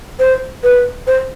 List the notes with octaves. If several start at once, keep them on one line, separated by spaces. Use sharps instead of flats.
C5
B4
C5